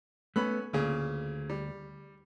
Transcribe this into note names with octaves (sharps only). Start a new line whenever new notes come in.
A3 B3 C#4 B5 F#6
D2 A#2 C#3
G3